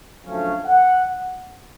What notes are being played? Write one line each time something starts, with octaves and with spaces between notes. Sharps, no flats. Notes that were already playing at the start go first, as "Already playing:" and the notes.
F#2 D3 F3 A3 C#4 F5
F#5